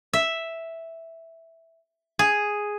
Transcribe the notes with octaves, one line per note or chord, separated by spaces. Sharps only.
E5
G#4